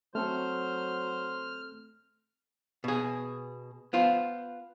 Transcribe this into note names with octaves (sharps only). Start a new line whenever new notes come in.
F#3 A3 C4 A4 C5 F6
B2 G#4
B3 F4 C5